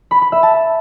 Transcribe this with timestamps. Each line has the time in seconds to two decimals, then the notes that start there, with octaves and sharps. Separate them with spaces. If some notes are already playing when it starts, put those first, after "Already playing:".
0.11 B5
0.22 B5
0.32 E5
0.43 A5